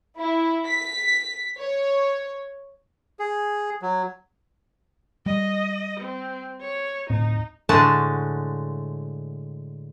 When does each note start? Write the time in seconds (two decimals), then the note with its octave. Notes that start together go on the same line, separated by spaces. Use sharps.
0.18 E4
0.66 B6
1.59 C#5
3.19 G#4
3.82 F#3
5.26 G3 D#5
6.01 C4
6.61 C#5
7.10 D1 A2 C4 D#4
7.69 A2 D3 G#3 F#4 A5